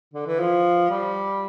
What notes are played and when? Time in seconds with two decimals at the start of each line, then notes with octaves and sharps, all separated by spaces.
0.14 D3
0.27 E3
0.40 F3
0.90 G3